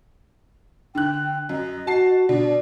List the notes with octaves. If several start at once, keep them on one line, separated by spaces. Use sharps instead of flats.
D3 G5 F#6
F#2 D#5
F#4 A5 C7
B2 D4 D5